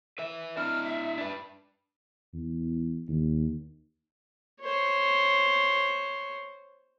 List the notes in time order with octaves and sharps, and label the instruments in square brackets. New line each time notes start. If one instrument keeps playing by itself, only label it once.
[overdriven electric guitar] B4 E5
[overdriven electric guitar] D4 E4 [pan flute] F6
[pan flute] E5
[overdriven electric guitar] D4 B4
[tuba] E2
D#2
[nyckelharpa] C5 C#5